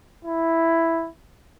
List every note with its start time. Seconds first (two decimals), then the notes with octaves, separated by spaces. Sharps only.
0.25 E4